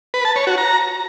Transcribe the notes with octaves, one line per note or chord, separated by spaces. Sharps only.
B4
A5
C#5
F#4
A#5